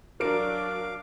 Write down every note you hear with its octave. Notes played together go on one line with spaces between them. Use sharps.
F#3 D4 A#4 F5 D6 D7